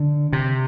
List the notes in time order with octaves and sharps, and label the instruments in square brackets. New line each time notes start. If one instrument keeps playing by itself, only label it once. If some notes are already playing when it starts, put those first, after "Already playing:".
Already playing: [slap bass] D3
C3